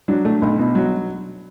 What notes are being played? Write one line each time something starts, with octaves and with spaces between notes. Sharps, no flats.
F#3 D4
A3
B1
B2
F#3